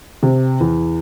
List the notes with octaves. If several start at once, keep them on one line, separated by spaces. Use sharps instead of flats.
C3
E2